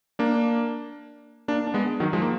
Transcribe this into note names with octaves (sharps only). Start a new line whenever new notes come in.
A#3 D4
A#3 D4
D4
G#3 B3
D#3 F#3
F3 G#3
A#3